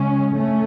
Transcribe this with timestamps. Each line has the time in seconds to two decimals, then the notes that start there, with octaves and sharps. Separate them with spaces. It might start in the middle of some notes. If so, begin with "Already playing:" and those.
Already playing: C#3 G#3 C#4
0.34 A3 C#4